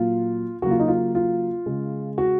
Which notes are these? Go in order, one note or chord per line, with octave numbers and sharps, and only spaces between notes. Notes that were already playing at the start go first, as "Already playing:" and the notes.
Already playing: A#2 F#3 A#3 F4
C#3 F#3 A#3 F#4
F4
D#4
F4
F4
C#3 G#3
F#4